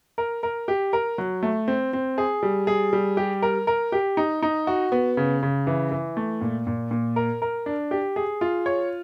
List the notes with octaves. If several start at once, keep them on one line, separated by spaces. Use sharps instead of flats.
A#4
A#4
G4
A#4
F#3
A3
C4
C4
G#4
G3
G#4
G3
G4
A#4
A#4
G4
D#4
D#4
F#4
B3
C#3
C#3
E3
E3
A3
A#2
A#2
A#2
A#4
A#4
D4
G4
G#4
F4
C#5